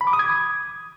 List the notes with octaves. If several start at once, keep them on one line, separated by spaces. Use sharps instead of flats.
B5
D6
D#6
G#6